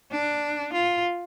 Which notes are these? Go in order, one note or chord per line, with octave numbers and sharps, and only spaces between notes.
D4
F4